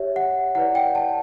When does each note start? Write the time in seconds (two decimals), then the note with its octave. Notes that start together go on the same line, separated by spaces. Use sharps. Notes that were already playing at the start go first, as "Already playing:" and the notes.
Already playing: G4 C#5 E5
0.16 F#5
0.55 E4 B4 D5 F#5
0.75 G5
0.95 A5